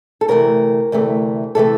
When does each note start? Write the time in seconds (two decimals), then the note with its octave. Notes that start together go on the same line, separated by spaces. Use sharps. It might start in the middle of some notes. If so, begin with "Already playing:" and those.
0.21 A4
0.28 D2 C3 E3 A3 A#4
0.92 D2 C3 E3 A3
1.55 C3 E3 A3 A4